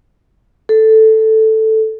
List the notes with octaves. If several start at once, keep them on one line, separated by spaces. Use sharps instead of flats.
A4